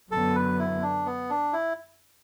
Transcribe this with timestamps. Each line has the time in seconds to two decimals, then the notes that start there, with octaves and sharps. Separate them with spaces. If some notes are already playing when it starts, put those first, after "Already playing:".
0.11 F#2 D3 F#3 B3 A4
0.35 B4
0.59 E4
0.83 D4
1.06 B3
1.30 D4
1.53 E4